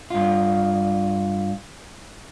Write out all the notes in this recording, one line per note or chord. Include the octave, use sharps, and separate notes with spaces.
G2 F4